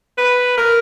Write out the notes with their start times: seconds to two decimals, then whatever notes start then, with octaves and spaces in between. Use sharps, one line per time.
0.18 B4
0.57 A#4